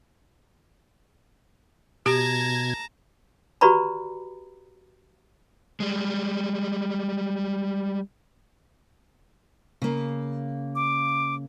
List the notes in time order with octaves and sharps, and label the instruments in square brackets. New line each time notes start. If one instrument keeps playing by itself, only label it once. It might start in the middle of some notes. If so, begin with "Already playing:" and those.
[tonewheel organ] B2 G#6 [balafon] G4 [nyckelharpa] A5 A#5
[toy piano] F#4 G4 B4 D5 A#5 B5
[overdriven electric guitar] G3 G#3
[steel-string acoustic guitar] C#3 A#3
[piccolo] D6